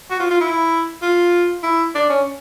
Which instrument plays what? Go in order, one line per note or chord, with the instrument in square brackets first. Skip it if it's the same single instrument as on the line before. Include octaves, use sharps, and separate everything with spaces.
[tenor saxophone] F#4
F4
F4
E4
F4
E4
D4
C#4